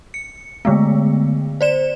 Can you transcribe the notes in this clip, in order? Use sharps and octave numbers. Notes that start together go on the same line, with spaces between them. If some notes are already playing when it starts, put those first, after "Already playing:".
C#7
D3 G#3 A3 B3
C5 D5 E7